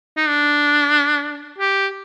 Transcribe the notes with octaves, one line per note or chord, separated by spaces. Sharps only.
D#4
D4
G4